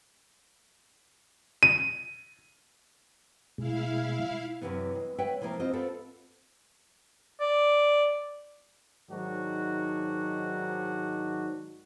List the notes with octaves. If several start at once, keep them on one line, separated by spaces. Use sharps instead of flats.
D#7
B2 G#3 E4 F5
F#2 A2 C3 E3 B3
G#3
B4 C#5 E5 F#5 G5
C3 E3 F3 A3 A#3
C4 F4 D#5
B3 C4 F4 A4
D5
G#2 D#3 F#3 D4 F#4